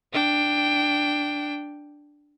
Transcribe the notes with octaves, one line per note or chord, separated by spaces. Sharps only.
D4 G5